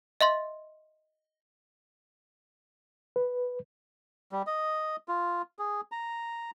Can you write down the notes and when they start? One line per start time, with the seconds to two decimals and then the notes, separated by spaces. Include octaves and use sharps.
0.21 D#5 E5 C6 A6
3.16 B4
4.32 G3
4.47 D#5
5.08 F4
5.59 G#4
5.92 A#5